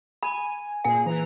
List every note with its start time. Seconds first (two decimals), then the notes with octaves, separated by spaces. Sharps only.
0.23 G#5 B5
0.85 A#2 A#3 G#4 G#5
1.06 E3 A#5